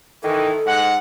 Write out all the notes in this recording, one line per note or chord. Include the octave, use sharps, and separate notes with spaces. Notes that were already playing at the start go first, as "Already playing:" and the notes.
D#3 E3 A4
G#2 F#5